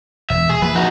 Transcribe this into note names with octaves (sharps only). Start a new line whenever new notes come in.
E1 E5
G#4
F3 A#3 B4
D#4 F#4